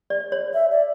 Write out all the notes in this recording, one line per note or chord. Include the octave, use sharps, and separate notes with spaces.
D5
C#5
E5
D5